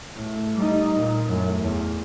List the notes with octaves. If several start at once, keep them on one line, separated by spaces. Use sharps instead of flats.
A2
G3 D#4
A#2
F#2 A2
E2